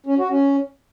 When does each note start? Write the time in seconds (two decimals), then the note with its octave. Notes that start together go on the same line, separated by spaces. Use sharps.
0.06 C#4
0.18 F#4
0.30 C#4